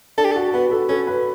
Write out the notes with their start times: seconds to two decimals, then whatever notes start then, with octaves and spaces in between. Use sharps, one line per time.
0.18 D4 A4
0.24 G4
0.31 A4
0.36 F#4
0.53 B3 B4
0.71 A4
0.89 C#4 A4
1.07 B4